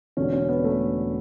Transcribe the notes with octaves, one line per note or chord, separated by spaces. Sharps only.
E1 E2 D3 C#4
C#4
B3
A3